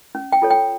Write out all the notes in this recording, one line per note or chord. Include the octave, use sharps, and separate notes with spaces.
C#4
G5
F4 A4 C#5
G5